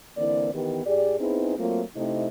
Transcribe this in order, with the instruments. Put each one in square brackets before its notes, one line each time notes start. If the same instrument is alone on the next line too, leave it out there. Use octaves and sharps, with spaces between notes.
[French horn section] D3 E3 A#3 C4 E4 D5
D#3 E3 B3 G4
A2 G4 G#4 D5
B3 C4 D#4 E4 G#4
F#3 A3 A#3 C4 F4
C3 A3 C4 D#4 E4 D#5